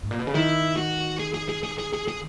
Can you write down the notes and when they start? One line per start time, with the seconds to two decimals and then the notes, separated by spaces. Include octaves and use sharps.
0.03 G#2
0.11 A#2
0.19 B2
0.27 C#3
0.34 D#3 E4
0.77 F#4
1.19 G#4
1.35 G#4
1.49 G#4
1.64 G#4
1.78 G#4
1.93 G#4
2.08 G#4